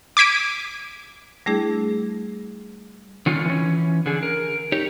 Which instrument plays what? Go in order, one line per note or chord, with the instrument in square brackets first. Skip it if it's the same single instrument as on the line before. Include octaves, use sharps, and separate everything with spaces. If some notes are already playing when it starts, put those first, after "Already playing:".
[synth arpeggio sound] D6 G#6 B6 D7 D#7
[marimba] G3 A3 D4 E4 G#4
[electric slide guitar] D3 D#3 C#4 F4
E3 C#4
D3 G#4
A#4
D#4 G4 C#5